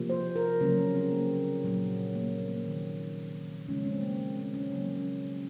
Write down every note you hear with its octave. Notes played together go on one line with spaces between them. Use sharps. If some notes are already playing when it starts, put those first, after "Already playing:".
Already playing: C3 F3 A#3
C5
A#4
C#3 F#3 A#3 C#4
C4
C4
A#3
A#2 F#3 A#3
A#3
C4
A#3
D#3 A#3
C#3 F3 G#3 C#4
C4
A#3
A#3
C4
C#4
C#3 F#3 A#3
C#4